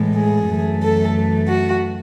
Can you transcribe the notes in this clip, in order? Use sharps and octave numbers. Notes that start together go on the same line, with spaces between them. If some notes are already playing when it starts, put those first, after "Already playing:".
Already playing: A2 E3 G#3
G#4
F#2 E3 A3
A4
F#4